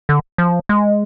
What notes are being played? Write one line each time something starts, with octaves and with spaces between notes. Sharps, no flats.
D3
F3
G#3